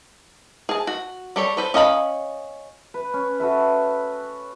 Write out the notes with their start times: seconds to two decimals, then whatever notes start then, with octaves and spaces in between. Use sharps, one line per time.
0.69 G#4 A5
0.87 F#4
1.36 G3 A4 C#5
1.57 A4 B4 C5
1.74 C#4 D#5 F5 A#5 B5
2.94 B4
3.14 C#4
3.40 F#4 A4 B4 E5